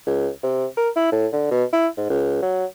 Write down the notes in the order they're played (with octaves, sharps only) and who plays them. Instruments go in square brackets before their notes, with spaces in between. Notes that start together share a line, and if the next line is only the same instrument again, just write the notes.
[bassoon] C#2
C3
A#4
E4
A2
D3
B2
E4
G#2
C#2
F#3